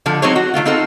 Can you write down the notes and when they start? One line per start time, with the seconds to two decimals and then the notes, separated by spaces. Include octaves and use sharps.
0.06 D3 F3 A4
0.22 F#3 G#3 C4 D#4 C5 C#5
0.36 F#4
0.54 D#3 F#3 A3 F4
0.65 C4 D#4 F4 F#4 A4 C5